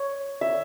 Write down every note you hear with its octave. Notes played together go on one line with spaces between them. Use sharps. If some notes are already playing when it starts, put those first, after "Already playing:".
Already playing: C#5
E5